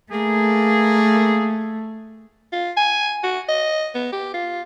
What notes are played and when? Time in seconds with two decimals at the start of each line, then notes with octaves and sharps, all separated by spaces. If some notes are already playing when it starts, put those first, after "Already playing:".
0.12 A3 A#3 G#4
2.52 F4
2.77 G#5
3.24 F#4
3.49 D#5
3.95 B3
4.13 G4
4.34 F4